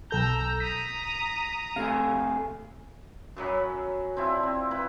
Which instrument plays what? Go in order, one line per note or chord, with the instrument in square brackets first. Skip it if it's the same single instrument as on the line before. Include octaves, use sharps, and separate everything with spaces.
[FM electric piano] B1 A4 G6 [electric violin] A#5 E6
[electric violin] A#5 D#6 [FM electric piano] B6
[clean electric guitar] C3 A3 G#4 [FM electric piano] F5
[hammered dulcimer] F#2 F#3 C#4 B5
C4 D4 E4 F4
C4
E4 B4 B5